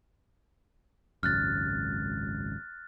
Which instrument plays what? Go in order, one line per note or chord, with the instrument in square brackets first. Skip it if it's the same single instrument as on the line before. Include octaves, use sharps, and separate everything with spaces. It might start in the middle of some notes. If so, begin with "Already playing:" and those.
[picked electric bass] G#1 C#2 F#2 [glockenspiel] F6 F#6 A6